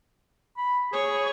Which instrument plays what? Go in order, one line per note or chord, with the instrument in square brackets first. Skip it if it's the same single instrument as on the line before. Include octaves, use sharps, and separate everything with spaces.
[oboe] B5
[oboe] G#4 [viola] C#5